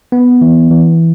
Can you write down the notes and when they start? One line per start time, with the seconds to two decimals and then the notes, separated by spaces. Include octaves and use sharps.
0.12 B3
0.41 E3
0.71 E3